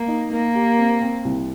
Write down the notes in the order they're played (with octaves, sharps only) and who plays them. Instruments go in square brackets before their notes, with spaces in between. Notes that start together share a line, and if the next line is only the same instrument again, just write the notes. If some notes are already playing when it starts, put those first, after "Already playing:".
Already playing: [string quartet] A#3
[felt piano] D#4
[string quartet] A#3 [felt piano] A#4
[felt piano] G4
C4
C4
C2